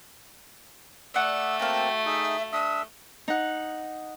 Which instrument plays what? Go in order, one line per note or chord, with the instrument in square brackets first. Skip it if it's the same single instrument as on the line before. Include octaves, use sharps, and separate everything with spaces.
[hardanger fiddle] A3 [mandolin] D5 F#5 [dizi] E6
[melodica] A#3 C4 A5 [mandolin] F#4 F5 [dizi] G5
[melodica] D#4 G#4 [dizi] E5
[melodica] D4 E5 E6 [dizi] D#6
[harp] D#4 F#5